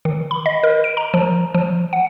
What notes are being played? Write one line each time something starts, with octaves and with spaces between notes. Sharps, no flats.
D#3
B5
D#5
A#4
D7
A#5
F3
F3
F#5